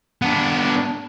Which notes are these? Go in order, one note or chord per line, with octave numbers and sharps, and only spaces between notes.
B3 D4